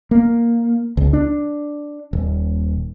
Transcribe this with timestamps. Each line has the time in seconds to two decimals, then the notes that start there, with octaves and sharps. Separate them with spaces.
0.11 A#3
0.97 C#2
1.13 D4
2.13 D#1